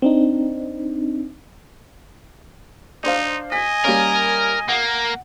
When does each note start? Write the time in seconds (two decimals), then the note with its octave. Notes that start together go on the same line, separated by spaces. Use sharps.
0.02 C4 D4 D#4
3.04 D4 D#4 C5 F5
3.52 D#5 G#5 B6
3.84 G3 A#3 C#4 A#4
4.69 A#3 F#5